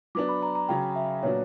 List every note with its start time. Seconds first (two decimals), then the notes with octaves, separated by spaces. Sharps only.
0.15 F#3 B3 D4 D6
0.29 B5
0.43 A#5
0.55 A#5
0.69 C#3 F#3 C#4 G5
0.96 E5
1.23 A#2 F#3 B3 D4 F#4 C#5